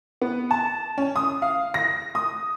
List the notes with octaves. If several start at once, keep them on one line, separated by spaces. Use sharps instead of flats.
B3
A5
C#4
D#6
F5
A#6
D#6